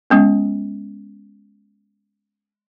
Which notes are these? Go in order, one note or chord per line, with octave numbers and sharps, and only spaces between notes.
G#3 B3 C#4